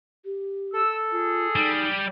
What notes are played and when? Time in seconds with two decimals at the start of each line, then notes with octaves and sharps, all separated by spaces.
0.25 G4
0.74 A4 E6
1.12 F4 G#4
1.56 G3 D#4